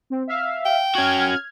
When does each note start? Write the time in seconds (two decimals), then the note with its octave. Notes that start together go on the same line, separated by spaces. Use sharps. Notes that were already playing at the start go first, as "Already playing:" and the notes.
0.10 C4
0.27 E5 F5
0.66 G5
0.95 C#4 F#4 F6 G#6